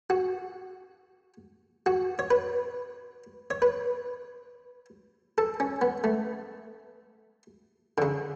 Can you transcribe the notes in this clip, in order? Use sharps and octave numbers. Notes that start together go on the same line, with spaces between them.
F#4
F#4
C#5
B4
C#5
B4
A4
C#4
B3
A3
D3
C#3